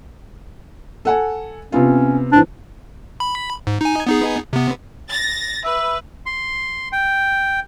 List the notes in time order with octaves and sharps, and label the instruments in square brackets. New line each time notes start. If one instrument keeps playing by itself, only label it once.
[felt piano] A4 F#5 G#5
[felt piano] C3 B3 F4 [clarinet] C#4
[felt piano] E3 C4 [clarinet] D4
[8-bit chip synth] B5
G#2
D#4 G#5
B3 D#4 G#4
C3 B3
[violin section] A6 A#6
[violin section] B4 [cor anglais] E5
[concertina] C6
G5